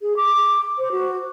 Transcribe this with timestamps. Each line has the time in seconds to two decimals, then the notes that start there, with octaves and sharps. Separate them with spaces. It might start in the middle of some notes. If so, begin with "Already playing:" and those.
0.02 G#4
0.17 D6
0.78 C5
0.92 F#4